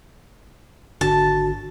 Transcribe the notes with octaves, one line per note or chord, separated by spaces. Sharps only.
G#1 D3 F#4 A5